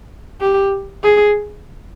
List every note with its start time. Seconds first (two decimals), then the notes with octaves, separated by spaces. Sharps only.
0.41 G4
1.03 G#4